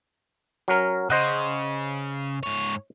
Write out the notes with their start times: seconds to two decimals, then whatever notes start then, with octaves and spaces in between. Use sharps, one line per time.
0.68 F#3 C#4 A#4
1.10 C#3 C5 D#5 F#5
2.43 G#2 C#5